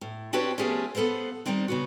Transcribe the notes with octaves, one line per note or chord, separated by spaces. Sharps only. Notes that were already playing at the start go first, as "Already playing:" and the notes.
A2
C4 D4 F#4 G4 B4 C#5
F3 A3 B3 C#4 G4 G#4
B3 A4 B4 C5 F5
D#3 G3 A#3 C4 D4
C#3 B3 F#4